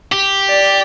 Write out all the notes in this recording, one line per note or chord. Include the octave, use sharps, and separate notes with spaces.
G4
D5